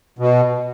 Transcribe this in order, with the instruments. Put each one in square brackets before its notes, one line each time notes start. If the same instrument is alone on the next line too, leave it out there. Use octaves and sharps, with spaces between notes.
[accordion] B2